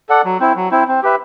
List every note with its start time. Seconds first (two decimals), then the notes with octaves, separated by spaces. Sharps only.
0.09 A4 D5 F#5
0.25 F#3
0.40 C4 E4
0.56 F#3
0.71 C4 E4
0.88 C4
1.03 G4 B4 E5